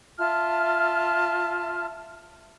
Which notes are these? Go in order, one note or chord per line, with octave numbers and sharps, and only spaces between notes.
F4 E5 A5 F6